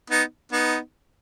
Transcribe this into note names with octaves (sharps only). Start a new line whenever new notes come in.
B3 D#4
B3 D#4